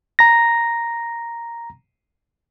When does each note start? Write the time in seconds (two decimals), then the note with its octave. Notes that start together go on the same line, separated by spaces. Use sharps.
0.19 A#5 A#6